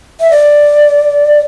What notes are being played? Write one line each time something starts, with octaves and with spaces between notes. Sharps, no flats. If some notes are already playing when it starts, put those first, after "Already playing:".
E5
D5